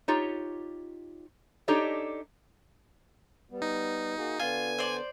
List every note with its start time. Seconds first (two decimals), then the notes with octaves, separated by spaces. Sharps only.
0.08 D#4 F4 G4 C#5
1.68 D4 D#4 G4 A4 C#5 D#5
3.50 G3 B3
3.62 D#4
4.17 A#3 F#4 G#4
4.40 D3 B3 D4 F4 G#5
4.78 C5 D5